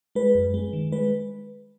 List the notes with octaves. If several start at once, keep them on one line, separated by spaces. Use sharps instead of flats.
G#3 B4
F#2
G#3
D#3
G#3 B4